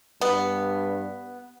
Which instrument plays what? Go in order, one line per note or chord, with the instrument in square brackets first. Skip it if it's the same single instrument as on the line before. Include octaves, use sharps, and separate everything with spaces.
[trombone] G2 [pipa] B3